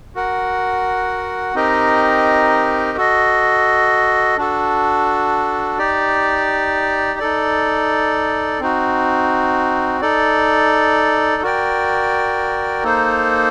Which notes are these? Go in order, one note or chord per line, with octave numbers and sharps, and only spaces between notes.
F#4 A#4 F#5
C4 D#4 G4 A#4 D#5
F#4 A4 D#5
D4 F#4 A4
D#4 G4 D5
D#4 A4 D5
C4 D#4 F#4
D#4 A4 D5
F#4 A#4 D5 G5
A#3 D#4 A4 C5